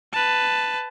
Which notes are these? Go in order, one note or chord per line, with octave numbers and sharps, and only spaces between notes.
B4 A5